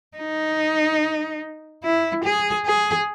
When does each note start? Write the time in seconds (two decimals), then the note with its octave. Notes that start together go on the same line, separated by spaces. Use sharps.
0.17 D#4
1.84 E4
2.24 G#4
2.66 G#4